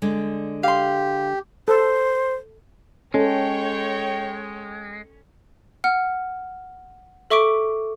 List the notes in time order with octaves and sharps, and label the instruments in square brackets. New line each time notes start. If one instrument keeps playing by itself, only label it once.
[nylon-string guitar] D3 G#3 D5
[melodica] G4 [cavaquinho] F5 C6
[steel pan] A4 [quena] C5
[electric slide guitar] G#3 [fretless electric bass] C#4 [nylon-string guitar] A4 [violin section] C#5 G5
[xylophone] F#5 F6
A4 E5 C#6 D6 B6 D7